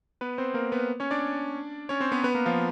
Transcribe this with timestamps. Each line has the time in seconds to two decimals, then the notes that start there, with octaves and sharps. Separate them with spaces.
0.21 B3 B4
0.38 C4 C5
0.54 A#3 A#4
0.72 B3 B4
1.00 C#4 C#5
1.11 D4 D5
1.89 C#4 C#5
2.00 C4 C5
2.12 B3 B4
2.24 B3 B4
2.35 A#3 A#4
2.46 F3 F4